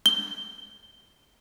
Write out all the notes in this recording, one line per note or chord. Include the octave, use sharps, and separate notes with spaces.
G7